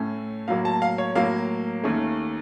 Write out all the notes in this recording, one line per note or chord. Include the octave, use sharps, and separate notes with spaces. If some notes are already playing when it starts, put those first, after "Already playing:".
Already playing: A2 A3 C#4
A2 F#3 A#3 F5
A5
F5
C#5
A2 F#3 A#3 F5
D#2 D#3 A3 C#4